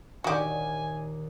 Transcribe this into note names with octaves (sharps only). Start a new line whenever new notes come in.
D#2 A#2 D#3 F#4 G4 G#5